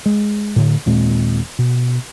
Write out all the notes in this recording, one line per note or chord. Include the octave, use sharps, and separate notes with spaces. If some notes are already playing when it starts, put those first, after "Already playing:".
G#3
A2 D3
D#2 A#2 G#3 C4
B2